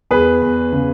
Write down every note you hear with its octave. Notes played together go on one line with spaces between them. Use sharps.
E2 G#4 B4
E2
C#3